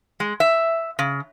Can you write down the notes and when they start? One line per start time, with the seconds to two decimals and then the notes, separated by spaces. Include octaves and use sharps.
0.20 G#3
0.40 E5
0.99 C#3